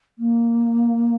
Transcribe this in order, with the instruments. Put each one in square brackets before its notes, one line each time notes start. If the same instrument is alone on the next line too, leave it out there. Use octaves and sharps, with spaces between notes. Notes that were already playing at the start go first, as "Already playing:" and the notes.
[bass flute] A#3